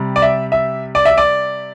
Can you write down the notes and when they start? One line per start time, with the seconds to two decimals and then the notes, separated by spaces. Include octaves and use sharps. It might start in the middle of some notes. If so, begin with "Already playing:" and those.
Already playing: C3 G3
0.16 D5
0.22 E5
0.52 E5
0.95 D5
1.05 E5
1.18 D5